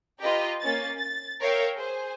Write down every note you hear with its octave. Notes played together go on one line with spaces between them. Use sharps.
F4 G4 B4 D#5 G5 A#5
A#3 C#4 A6
A6
A#4 C#5 E5 F5 G5
G#4 C5